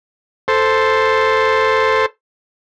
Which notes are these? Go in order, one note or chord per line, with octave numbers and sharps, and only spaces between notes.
A4 C5